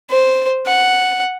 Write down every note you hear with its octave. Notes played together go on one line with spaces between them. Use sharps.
C5
F#5